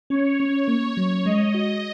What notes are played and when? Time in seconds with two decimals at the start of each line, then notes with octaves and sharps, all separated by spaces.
0.10 C#4 C#5
0.40 C#4
0.68 A#3
0.97 F#3
1.25 G#3 D#5
1.54 F#4